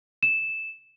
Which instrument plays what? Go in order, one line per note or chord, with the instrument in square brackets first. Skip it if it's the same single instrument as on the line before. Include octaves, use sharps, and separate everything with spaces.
[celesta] E7